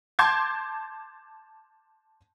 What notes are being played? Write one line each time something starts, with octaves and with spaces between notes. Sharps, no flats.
A5 C6 D6 G6 G#6